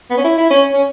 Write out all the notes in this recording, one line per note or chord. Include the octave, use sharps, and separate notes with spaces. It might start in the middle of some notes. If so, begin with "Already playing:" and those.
B3
C#4
E4
E4
C#4
C#4